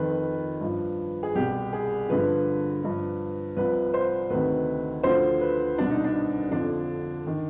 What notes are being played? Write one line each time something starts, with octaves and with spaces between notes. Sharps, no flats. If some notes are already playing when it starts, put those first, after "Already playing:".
Already playing: F2 D#3 B4
G2 F3
G#4
C2 B2 G4
G#4
G2 D3 F3 B4
G2 F3
C2 C3 F3 B4
C5
D2 C3 D#3 B4
D2 D3 F3 C5
B4
C2 B2 D4
D#4
D4
F2 D3 F3 D4
D#3